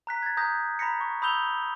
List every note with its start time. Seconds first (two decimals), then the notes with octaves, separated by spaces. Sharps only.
0.07 A#5 F#6 B6
0.23 G#6 A6
0.37 A#5 D#6 G6 A#6
0.79 A#5 B5 A#6 B6 C#7
1.01 C#6
1.22 B5 D#6 E6 G6 F7 G7